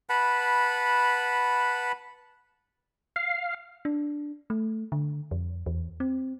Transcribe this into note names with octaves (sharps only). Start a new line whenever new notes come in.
B4 F#5 A5 B5
F5
D4
A3
D3
F2
E2
C4